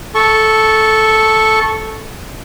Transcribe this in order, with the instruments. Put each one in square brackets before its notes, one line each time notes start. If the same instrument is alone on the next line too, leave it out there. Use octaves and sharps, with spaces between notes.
[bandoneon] A4 C#6